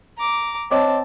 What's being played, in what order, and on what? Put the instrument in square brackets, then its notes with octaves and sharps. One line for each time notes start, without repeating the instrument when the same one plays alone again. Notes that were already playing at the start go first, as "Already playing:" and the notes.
[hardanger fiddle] A#5 D6
[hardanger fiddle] C4 A5 [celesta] C#5 D#5 D6